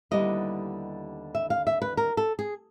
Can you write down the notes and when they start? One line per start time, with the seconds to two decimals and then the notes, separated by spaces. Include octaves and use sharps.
0.11 D#2 D3 G3 B3 E4 D#5
1.35 E5
1.50 F5
1.67 E5
1.82 B4
1.97 A#4
2.17 A4
2.39 G#4